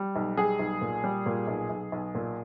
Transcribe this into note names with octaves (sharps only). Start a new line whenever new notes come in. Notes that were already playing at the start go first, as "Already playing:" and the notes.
Already playing: G3
B1
G3 G#4
B1
A#2
G3
A#2
B1
B1
B1
A#2